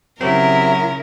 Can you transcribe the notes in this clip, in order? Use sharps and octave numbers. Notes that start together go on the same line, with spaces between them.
C#3 F#3 C4 E4 G4 A#4